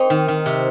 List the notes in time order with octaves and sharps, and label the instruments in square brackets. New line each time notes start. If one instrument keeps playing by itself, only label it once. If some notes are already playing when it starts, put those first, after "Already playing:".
Already playing: [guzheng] C4 D#4 [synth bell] A#4 C5
[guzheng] D#3
D#3
C3